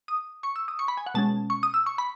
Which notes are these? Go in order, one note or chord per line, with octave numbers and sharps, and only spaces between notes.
D#6
C#6
E6
D#6
C#6
B5
G#5
F#5
B2 G#3 C#4 A5
C#6
D#6
E6
C#6
B5